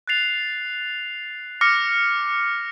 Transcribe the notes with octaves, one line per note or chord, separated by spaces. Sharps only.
F#6 A6 C7 F7
D6 F6 A#6 C#7